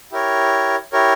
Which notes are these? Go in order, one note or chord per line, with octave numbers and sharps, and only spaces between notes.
E4 G4 A#4 C#5
E4 G4 A#4 C#5